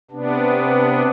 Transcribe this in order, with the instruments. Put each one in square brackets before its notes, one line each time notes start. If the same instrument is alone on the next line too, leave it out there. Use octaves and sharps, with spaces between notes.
[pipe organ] C3 B3 D4